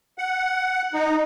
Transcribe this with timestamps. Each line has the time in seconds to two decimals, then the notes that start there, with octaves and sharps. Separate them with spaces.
0.18 F#5
0.94 D#4